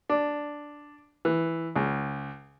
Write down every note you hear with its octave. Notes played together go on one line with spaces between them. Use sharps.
D4
E3
C#2